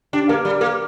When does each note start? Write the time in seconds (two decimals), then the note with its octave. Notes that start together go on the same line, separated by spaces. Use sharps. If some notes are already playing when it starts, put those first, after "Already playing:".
0.13 D4 G4
0.29 A#3 A#4
0.45 G3 D5
0.61 A#3 A#4